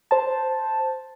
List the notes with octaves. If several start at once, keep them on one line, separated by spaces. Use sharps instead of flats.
C5 A5